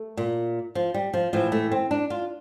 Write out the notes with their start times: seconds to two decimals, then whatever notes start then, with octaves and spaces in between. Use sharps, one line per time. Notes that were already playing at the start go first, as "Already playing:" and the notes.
Already playing: A3
0.17 A#2
0.75 F3
0.94 G3
1.14 F3
1.33 A2 E3 F3
1.52 A3
1.72 C4
1.91 D4
2.10 F4